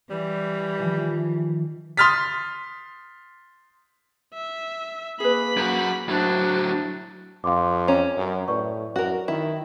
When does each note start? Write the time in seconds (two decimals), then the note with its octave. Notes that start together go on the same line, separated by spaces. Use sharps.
0.10 E3 G3
0.80 D#3 F3
1.97 C6 D#6 F6 A6 B6
4.34 E5
5.20 A#3 G#4 B4 B5
5.57 F#2 F#4
6.09 A2 F#3 D4 C5
7.44 F2 F5 C6 D6
7.88 C#4 A#5
8.17 F#2
8.48 A2 B4 D5 C#6
8.96 F#2 F#4 A#4
9.28 D#3 E4